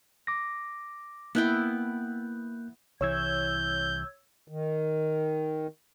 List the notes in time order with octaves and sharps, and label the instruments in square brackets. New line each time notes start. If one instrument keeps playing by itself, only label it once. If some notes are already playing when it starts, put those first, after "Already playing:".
[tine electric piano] D6 A#6
[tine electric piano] A#3 F#6 G6 [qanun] B3 E4 G5
[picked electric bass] C2 E3 [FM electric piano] C#5 E6 G#6 [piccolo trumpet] G6
[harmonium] D#3